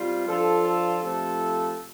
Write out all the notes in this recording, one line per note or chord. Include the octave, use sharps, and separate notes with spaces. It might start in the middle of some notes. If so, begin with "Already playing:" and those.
Already playing: C3 G3 F4
F3 D4 F4 A4
A4
C3 F3 A3 F4 A4